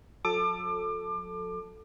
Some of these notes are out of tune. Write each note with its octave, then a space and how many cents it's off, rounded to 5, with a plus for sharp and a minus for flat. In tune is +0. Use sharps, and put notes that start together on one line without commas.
F#3 -45 A4 +0 D6 +30